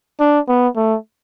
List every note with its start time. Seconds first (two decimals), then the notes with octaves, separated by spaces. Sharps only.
0.20 D4
0.48 B3
0.76 A3